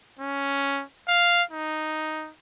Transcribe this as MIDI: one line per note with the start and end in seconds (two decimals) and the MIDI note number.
0.19 0.83 61
1.08 1.43 77
1.51 2.31 63